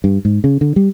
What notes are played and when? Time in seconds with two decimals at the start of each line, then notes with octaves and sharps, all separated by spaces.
0.04 G2
0.25 G#2
0.44 C#3
0.61 D3
0.76 G3